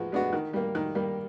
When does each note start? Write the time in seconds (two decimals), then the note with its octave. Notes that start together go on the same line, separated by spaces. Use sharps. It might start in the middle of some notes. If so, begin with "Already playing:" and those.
Already playing: F3 G#3 B3 F#4
0.12 G#3 B3 D4 F#4
0.33 D#3
0.53 G3 A#3
0.75 D#3
0.95 G3 A#3